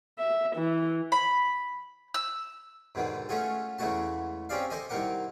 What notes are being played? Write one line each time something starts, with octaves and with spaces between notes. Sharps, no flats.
E5
E3
B5
E6
G#2 B2 D3 D#3
A3 C#4 F4 F#4 G#4 A4
E2 C#3 G#3 A3 F#4 A5
C4 C#4 G4 G#4 D5 F5
A4 C5 D5 D#5 G#5
C2 D#3 C4 A#4 F#5 D6